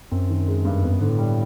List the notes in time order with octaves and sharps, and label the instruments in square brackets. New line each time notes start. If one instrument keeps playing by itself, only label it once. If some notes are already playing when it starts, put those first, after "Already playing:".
[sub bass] F#2 [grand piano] C4
[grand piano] D#3
G#3
G2
[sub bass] F2 [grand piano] B3
[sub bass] F#2
[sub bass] G#2 [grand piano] D3
[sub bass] A2
[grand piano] G3